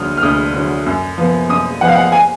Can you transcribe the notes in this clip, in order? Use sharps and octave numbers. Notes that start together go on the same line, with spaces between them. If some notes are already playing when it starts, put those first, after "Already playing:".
Already playing: D2 D3 F#3 D#6 F6
F6
D2 D#6
D3 F#3
F#2
F3 B3
F#2 D#6
F3 B3 F#5
F5
F#5
G#5